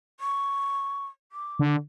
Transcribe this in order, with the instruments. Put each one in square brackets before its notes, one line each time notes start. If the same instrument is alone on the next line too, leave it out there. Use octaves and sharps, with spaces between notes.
[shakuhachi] C#6
D6
[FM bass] D3